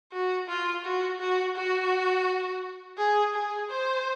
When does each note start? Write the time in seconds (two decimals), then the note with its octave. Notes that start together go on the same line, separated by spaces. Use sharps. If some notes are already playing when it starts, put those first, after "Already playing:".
0.12 F#4
0.48 F4
0.85 F#4
1.20 F#4
1.56 F#4
2.98 G#4
3.34 G#4
3.70 C5